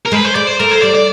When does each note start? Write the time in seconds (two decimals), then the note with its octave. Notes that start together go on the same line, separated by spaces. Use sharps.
0.06 A#4
0.12 G#3 B4
0.25 C5
0.35 G#3 D5
0.47 C5
0.60 A3 A#4
0.71 C5
0.83 G3 D5
0.95 D5